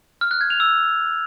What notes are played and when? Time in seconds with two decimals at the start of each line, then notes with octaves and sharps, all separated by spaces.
0.21 F6
0.31 F#6
0.41 G#6
0.50 F7
0.60 E6